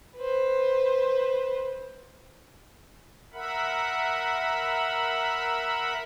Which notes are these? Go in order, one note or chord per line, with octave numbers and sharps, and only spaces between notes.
B4 C5
A#4 E5 F#5 B5